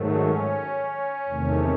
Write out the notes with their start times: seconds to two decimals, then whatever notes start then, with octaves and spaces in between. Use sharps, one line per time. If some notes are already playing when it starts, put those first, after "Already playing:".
Already playing: G#2 D#3 F#3 A3
0.14 C#4
1.27 E2 C3 D#3 A3